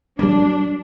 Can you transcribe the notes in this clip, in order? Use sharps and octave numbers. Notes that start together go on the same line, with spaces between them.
F#3 G3 A#3 D4